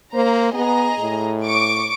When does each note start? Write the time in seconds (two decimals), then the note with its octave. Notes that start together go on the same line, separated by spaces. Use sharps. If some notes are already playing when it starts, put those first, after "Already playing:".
0.14 A#3 C5 A#5
0.53 B3 G#4 D#5 A#5
1.00 A2
1.44 C#6 D6 D7